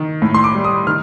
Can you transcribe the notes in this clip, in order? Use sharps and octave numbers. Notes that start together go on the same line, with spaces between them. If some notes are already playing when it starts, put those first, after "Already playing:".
Already playing: D#3
A2
C6
D6
G3
D#6
D#3 F6